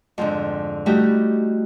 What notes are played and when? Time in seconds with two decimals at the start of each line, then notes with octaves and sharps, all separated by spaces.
0.18 F2 G#2 D3
0.86 G3 A3 D#4 E4 F#4 G4